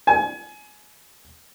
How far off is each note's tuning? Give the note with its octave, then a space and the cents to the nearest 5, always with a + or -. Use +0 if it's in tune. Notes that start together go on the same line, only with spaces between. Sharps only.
G#5 +25